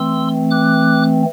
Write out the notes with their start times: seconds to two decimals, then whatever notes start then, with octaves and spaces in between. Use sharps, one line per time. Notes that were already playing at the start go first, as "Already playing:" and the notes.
Already playing: E3 A3 C4 C6 E6
0.51 D6 F#6